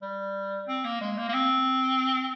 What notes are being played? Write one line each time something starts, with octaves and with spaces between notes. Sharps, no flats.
G3
C4
A#3
G#3
A#3
A#3
C4